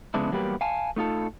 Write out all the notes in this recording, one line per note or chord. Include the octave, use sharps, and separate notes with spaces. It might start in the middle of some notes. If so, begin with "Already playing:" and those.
F2 C#3 G#3 B3 D4 E4
E2 F#3 G3 A#3 G4 B4
F5 G#5 A5
A3 D#4 F4 A4